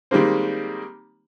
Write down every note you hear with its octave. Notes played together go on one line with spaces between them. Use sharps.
D#3 G3 G#3 A#3 C4